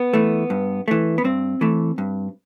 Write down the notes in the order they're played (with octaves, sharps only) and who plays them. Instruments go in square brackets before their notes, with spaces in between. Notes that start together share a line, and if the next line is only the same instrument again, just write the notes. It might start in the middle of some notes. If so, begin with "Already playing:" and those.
Already playing: [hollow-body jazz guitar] B3
E3 A3
G2
E3 A3
B3
G2 C4
E3 A3
G2